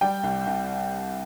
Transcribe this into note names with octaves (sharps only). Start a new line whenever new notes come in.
G3 D5 G5
C2
C2